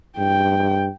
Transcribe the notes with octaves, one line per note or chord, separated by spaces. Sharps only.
G2 G5